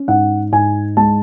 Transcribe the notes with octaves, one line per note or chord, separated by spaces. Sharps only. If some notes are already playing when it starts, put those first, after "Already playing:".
Already playing: C#4
G#2 F#5
G#2 G#5
G#3 A5